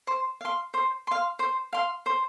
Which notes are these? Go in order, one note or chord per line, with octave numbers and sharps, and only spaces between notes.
C5
F5 C6
C5
F5 C6
C5
F5 C6
C5